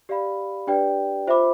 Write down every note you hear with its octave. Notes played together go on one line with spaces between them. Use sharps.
G4 D5 F5 B5
D4 G4 B4 D5 G5
F4 C5 E5 B5 D6